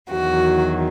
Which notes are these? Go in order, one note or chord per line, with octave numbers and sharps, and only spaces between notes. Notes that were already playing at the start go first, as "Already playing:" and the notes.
E2 D#3 F#3 F#4